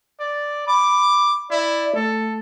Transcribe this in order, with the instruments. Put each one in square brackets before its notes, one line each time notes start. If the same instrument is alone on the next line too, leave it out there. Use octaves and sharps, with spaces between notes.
[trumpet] D5
[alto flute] B5 [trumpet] D6
[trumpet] E4 [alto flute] D5
[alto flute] A3 [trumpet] A4